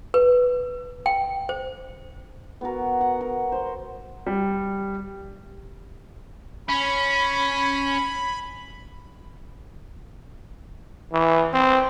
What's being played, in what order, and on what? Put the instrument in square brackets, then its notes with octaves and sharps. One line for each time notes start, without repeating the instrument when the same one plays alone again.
[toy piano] B4
G5
C5
[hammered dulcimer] B3 F#4 A#4
F#5
A#4
C5 C6
[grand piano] G3
[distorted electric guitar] C#4 [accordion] B5
[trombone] E3
C4